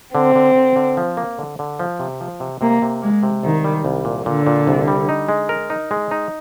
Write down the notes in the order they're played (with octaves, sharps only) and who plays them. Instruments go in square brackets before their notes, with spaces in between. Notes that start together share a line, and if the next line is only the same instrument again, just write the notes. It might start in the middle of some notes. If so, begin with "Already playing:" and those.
[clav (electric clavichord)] D3 [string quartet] C4
[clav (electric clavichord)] D3
D3
D3
F3
A#3
D3
D3
F3
C3
F3
C3
[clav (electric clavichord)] C3 [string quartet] A#3
[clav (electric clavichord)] C3
[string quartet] G#3 [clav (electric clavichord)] A#3
[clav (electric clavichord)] C3
[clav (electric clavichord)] C2 [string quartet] D#3
[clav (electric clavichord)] G3
C2
A#2
[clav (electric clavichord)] A#2 [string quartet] D3
[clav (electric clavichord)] A#2
C2
G3
D#4
G#3
A#4
D#4
G#3
D#4